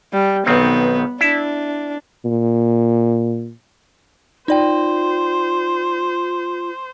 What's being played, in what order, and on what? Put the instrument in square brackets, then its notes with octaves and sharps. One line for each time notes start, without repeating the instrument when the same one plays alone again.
[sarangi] G3
[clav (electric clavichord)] B1 D#3 C4 [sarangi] B3
[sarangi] D4 [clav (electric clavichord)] E4
[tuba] A#2
[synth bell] D#4 D5 G5 [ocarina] F4 [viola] C5